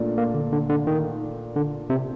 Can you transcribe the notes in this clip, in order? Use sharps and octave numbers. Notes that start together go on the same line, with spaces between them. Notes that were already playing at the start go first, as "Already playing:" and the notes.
Already playing: A#2 A3 D4
A#3
D3
D3
D3
D#3
D3
C3